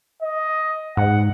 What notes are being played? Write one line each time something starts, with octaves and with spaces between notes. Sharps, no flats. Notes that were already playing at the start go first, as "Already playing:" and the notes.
D#5
G#2 F#5